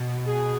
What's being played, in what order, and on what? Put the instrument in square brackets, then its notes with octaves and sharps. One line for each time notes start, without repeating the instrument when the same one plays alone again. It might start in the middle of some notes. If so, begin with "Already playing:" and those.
Already playing: [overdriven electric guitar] B2
[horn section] G#4